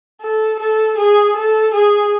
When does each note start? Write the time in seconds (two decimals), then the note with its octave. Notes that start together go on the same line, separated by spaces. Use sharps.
0.22 A4
0.59 A4
0.97 G#4
1.36 A4
1.74 G#4